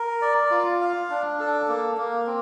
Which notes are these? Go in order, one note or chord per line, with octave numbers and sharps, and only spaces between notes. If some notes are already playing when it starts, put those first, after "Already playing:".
Already playing: A#4
D5
F4
F5
D4
A4
A#3
A#3
C4